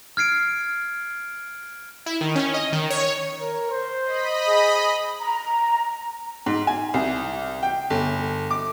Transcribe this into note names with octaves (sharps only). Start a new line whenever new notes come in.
F6 G#6 C7 D7
E4
D#3
C#4
D#5
D#3
C#5
A#4
C5
D#5 B5
G#4
A#5
G#2
G#5
C2
G5
G1
D6